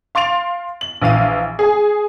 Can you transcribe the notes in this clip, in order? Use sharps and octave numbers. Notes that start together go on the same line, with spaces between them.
F5 C6 A6 D7 F7
F#7
A#1 E3 F5 D#7
G#4 G#5